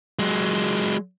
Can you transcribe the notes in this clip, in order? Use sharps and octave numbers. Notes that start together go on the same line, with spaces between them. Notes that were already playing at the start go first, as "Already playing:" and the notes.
F#3 G#3